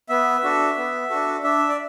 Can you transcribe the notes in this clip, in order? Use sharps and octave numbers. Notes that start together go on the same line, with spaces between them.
B3 E5
D4 F#4 A4
B3
D4 F#4 A4
D4 E5
D5